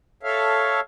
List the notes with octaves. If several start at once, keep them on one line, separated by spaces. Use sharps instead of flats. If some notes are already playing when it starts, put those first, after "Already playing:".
A4 C#5 E5 F5